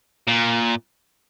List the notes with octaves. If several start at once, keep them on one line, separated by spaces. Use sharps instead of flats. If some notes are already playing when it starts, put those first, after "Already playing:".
A#2